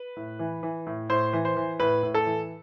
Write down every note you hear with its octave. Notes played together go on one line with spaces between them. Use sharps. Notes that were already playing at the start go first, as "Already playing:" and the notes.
Already playing: B4
A2
E3
E3
A2
A2 C5
E3
C5
E3
A2 B4
A2
A4
E3